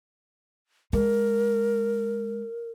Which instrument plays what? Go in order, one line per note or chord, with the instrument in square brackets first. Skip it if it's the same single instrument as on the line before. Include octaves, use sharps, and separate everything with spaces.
[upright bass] G#3 [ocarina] A#4